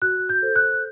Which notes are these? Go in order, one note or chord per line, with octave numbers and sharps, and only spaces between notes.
F#4 F#6
G6
A4 C5
F#6